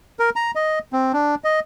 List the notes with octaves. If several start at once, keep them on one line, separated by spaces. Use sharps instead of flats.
A#4
A#5
D#5
C4
D4
D#5